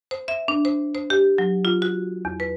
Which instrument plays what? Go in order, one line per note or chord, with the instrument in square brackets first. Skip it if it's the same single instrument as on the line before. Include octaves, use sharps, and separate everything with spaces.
[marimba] C5
E5
D4
C5
C5
G4
F#3
F4
F#4
E2
B4